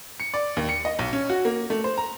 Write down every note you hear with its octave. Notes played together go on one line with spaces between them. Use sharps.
C#7
D5
D#2
C#7
D#5
B1
C#4
F#4
A#3
A3
C5
A#5